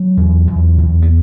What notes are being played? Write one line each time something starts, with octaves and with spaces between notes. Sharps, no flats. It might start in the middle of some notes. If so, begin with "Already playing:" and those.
Already playing: F#3
E2
E2
E2
B3